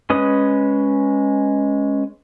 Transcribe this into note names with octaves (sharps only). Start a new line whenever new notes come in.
G#3 C#4 B4 D#6